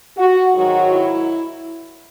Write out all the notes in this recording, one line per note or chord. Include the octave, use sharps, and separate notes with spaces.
F#4
G#2 D#3 F#3 F#4
E4